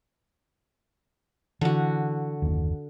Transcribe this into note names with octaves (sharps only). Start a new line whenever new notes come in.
D3 E3 F#4
F#1 D#2